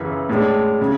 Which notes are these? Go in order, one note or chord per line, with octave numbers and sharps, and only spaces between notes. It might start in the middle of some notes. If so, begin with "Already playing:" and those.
Already playing: F#2 C#3 E3
A2 G#3 D4
C#3